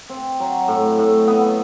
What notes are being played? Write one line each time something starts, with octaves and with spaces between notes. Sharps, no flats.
C4
F#3
A2
A2
B3